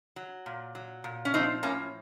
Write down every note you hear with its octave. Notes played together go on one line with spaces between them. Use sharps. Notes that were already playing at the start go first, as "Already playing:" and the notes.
F#3
A#2
F#3
A#2
C#4
F3 C4 D#4
A2 A#3 C#4